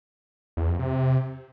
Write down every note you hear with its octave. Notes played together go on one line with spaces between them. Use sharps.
E2
F2
C3